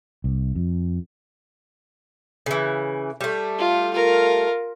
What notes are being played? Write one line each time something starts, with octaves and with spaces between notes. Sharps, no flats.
C2
F2
C#3 E3
G3 A3
F4
F4 A#4